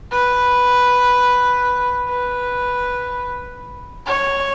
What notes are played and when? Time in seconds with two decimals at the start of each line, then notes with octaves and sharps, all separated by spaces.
0.12 B4
2.09 B4
4.06 C#5